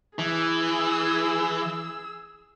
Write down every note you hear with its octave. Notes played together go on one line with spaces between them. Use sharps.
E3 G#4 E6